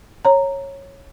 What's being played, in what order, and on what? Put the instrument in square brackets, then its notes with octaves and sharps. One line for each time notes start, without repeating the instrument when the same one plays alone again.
[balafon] C#5 A#5